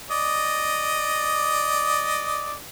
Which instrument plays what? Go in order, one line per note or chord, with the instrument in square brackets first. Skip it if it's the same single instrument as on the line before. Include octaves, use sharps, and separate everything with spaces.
[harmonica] D5 D#5